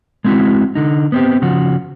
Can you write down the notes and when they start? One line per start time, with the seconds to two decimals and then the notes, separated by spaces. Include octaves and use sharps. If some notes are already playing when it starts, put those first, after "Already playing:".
0.24 G#3 A3 C4 D#4 E4 F#4
0.75 D3 D#4
1.12 B3 C4 G4
1.42 C#3 F3 F#4